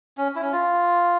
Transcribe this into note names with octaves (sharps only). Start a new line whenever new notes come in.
C#4
E4
C#4
F4